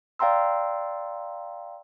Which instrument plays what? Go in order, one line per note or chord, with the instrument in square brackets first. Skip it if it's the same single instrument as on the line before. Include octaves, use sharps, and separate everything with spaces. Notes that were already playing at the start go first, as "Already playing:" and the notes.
[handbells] D5 F5 G5 A#5 C6 E6